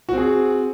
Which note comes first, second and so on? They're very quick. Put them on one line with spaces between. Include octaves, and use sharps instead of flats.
F#4 C4 G#4